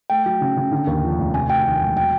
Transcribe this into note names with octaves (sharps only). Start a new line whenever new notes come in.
A3 G5
F#3
C#3
C#3
D3
D#2
F3
F1
C3 G#5
D2 G5
D#3
E1
F#3 G5